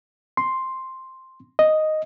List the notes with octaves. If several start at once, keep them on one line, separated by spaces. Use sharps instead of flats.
C6
D#5